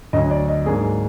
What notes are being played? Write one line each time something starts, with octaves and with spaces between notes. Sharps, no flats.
D2 D3 F#3 D#5
D5
D#5
G#2 F#3 A#3 D4 G#4